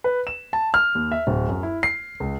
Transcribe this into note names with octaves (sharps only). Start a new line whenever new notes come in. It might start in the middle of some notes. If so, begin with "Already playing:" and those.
B4
E7
A5
F6
D#2
E5
D1
F#2
E4
C7
C#2